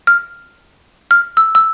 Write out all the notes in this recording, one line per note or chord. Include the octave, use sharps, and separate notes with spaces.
F6
F6
E6
E6